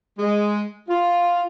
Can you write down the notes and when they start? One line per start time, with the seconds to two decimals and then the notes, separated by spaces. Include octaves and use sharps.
0.18 G#3
0.89 F4